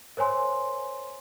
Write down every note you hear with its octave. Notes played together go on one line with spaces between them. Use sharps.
A#4 C5 C#5 G#5 C6